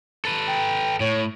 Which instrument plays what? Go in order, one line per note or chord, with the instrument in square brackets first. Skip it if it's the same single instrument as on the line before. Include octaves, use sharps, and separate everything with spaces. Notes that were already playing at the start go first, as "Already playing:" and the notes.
[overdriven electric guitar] A4 B4
[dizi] G5
[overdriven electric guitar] A2 [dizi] C#5